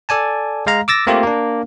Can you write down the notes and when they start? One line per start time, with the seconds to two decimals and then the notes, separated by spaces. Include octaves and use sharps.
0.09 A4 D5 G#5 A5
0.67 G#3 F5 A#5
0.88 D6 E6 A6 A#6
1.07 A3 A#3 C4 F4 G4
1.23 A#3 D4